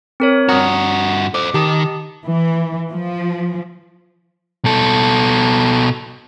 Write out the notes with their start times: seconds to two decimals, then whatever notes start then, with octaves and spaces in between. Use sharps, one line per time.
0.20 C4 A#4 C#5
0.49 G2 F#4 A#5 D#6
1.34 A4 C5 D6
1.54 D#3 G4 A5 D#6
2.24 E3
2.89 F3
4.65 B2 A4